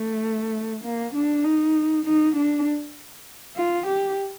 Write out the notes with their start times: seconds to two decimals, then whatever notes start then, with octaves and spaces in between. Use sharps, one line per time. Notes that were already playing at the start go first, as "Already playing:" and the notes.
Already playing: A3
0.84 A#3
1.14 D4
1.44 D#4
2.05 D#4
2.36 D4
3.56 F4
3.87 G4